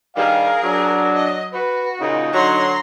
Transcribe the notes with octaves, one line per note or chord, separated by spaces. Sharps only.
G2 D#3 G3 G#4 A#4 F5
F#3 D4
D#5
F#4 B4
A#2 C#3 D#4
D3 F#3 A#5 C6